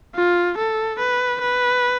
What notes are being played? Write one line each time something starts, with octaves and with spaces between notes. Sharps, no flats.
F4
A4
B4
B4